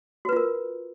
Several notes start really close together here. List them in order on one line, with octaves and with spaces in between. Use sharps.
F#4 B4 F4 A#4